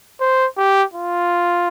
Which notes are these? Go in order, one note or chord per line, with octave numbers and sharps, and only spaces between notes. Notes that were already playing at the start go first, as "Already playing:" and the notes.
C5
G4
F4